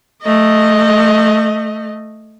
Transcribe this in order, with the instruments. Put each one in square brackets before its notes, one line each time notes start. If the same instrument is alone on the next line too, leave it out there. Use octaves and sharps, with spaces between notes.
[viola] A3 D#5